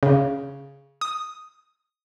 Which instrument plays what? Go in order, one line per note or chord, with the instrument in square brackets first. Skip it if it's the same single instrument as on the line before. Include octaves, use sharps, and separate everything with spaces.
[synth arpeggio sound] C#3
D#6